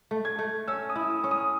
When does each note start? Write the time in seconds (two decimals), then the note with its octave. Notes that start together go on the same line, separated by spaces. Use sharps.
0.11 A3
0.25 G#6
0.39 A3
0.68 C#4 E6
0.89 D#6
0.96 E4
1.10 D#6
1.24 C#4
1.31 D#6